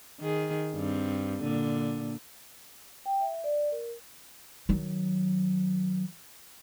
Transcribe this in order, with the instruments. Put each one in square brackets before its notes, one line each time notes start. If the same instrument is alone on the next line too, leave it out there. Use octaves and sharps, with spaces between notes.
[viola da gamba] D#3 G#4
G2 C4
A#2 D3
[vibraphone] G5
E5
D5
A#4
[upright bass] D#3 F#3